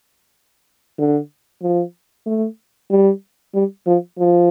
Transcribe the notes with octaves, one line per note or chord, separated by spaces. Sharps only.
D3
F3
A3
G3
G3
F3
F3